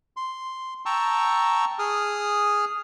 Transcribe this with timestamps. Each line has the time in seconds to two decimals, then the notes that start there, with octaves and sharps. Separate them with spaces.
0.17 C6
0.86 G5 A5 A#5 C#6 E6
1.79 G#4 D#6 F6